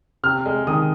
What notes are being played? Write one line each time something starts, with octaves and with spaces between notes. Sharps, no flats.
C3 F6
G#3
D#3 D#6